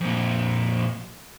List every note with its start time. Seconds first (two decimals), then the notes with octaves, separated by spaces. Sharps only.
0.01 F2 A#2